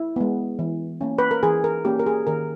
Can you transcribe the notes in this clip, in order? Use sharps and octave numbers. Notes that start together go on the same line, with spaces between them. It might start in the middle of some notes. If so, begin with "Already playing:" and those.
Already playing: E4
G#3 B3
E3
A#3 C#4
B4
A#4
E3 G#4
A#4
A#3 C#4 G4
A#4
G#4
D#3 A#4